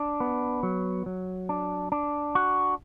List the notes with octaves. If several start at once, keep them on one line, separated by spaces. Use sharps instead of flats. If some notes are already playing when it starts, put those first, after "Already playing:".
Already playing: D4
B3
F#3
F#3
D4
D4
F#4